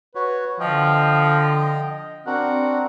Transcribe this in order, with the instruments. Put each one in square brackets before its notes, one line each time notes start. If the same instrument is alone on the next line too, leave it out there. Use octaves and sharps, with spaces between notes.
[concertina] F#4 C#5 [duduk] B4
[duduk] D3 [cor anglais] F3 [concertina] D#5 G5
[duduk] C4 [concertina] D4 F#4 A#4 [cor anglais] F#5